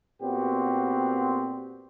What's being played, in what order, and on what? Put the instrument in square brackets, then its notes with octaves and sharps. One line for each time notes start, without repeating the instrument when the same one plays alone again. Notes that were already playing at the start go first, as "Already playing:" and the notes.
[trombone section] A#2 B3 C4 F#4 G4